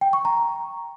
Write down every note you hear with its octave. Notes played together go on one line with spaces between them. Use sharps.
G5
C#6
A#5